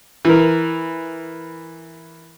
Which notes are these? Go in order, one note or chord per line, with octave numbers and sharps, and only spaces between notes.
E3 A#4